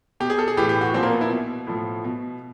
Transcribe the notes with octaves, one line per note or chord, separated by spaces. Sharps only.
B2 G4
G#4
A4
G#4
A2 E3 G4
G4
F#4
A#2 F3 C4
A#3
B3
E4
B2
A2 F3
B2